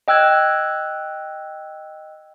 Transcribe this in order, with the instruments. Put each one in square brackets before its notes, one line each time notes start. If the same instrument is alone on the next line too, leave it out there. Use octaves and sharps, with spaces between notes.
[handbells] D#5 G5 E6 F#6 G#6